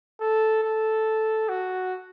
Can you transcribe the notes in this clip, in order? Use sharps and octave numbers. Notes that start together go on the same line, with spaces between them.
A4
A4
F#4